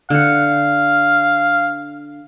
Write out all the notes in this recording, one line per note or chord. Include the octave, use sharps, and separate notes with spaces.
D3 F5 F#5